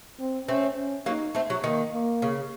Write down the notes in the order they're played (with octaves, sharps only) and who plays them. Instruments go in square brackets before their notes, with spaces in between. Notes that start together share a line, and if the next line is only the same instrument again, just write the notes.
[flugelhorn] C4
[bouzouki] A3 C4 [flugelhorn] C#4
[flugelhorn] C#4
[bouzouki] F#3 A#3 [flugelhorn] D#4
[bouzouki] A3 C4
F#3
[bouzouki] D#3 [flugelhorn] A#3
[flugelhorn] A#3
[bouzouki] C#3